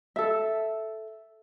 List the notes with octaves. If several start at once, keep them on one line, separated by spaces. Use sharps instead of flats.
A4 E5